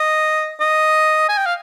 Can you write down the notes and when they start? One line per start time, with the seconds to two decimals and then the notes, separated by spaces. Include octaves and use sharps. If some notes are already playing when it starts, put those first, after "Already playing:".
Already playing: D#5
0.60 D#5
1.29 G#5
1.37 G5
1.46 F5